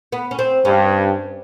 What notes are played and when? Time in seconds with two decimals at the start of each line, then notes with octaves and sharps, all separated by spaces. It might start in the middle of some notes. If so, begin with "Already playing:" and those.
0.12 B3
0.31 C#4
0.39 C4
0.65 G2 C#4